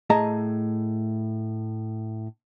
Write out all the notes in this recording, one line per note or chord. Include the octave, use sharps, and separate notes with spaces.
A2 A3 G#4 D#5 A5 A#5